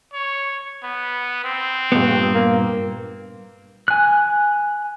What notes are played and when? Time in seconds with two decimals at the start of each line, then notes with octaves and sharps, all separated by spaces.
0.13 C#5
0.83 B3
1.44 C4
1.92 G2 A#2 B3
2.34 A#3
3.88 G#5 F#6